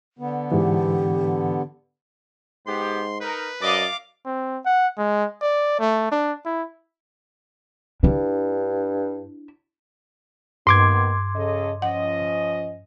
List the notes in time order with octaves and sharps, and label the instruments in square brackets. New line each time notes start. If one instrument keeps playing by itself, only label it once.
[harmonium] D3 B3
[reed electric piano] G#2 E3 [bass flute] G4
[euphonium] G#2 [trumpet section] B3 G4 [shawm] C6
[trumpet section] D#4 A#4 [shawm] B4
[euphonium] F#2 [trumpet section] D5 D#5 [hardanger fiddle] F5 D6
[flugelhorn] C4
F#5
G#3
D5
A3
D4
E4
[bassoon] G2 [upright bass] D4 E4
[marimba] G2 [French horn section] D#3 A#3 B3 [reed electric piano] C6 D6 G#6
[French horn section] C#3 A4 D#5
[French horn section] F3 C#4 D#5 [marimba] F#5